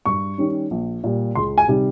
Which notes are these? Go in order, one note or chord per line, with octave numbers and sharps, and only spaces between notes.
G2 C#6
D#3 G3 C#4
A#1
A#2 G3
C#2 C6
G#5
C3 D#3 G3